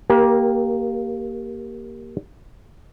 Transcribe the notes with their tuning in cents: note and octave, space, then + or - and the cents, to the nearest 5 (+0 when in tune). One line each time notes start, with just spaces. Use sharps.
A#3 +0 G4 +0 A#4 +30